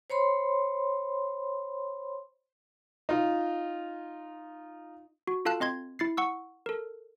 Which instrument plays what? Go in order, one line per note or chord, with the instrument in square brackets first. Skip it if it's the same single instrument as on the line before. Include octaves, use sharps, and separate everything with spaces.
[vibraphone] C5 C#5 B5 C6
[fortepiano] D#4 F4
[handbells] F#4
F4 A4 F5 A5 F#6
C4 D#5 C6 G#6
E4 A6 C7
F#5 C#6 E6
A4 A#4